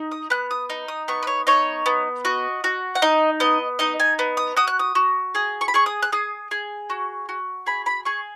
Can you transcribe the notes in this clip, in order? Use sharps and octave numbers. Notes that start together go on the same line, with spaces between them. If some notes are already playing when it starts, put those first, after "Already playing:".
Already playing: D#4
D#6
B3 F#6
D#6
D#4
D#6
B3 C#6
B4
C#5
D#4 C#5
B3
F#4 D#5
F#4
F#5
D#4 D#5
B3 D#5
D#4 D#5
G#5
B3
D#6
F#4 D#6
F#6
D#6
F#4
G#4 D#6
C#6
B5
G#4 C#6
D#6
F#6
G#4 D#6
G#4
F#4
F#4
G#4 B5
B5
G#4 C#6